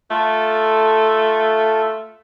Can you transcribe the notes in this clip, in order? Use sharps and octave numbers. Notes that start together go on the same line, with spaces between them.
A3 F4 A4